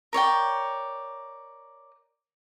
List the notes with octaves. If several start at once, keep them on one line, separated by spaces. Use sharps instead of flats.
A#4 C#5 D5 G5